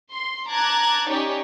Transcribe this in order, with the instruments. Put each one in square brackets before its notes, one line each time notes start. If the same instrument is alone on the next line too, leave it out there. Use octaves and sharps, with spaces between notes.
[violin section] C6
A5 A#5 D6 F#6 G#6 A6
C#4 D#4 G4 C#5 D5